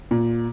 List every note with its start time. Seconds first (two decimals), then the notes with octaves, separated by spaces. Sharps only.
0.11 A#2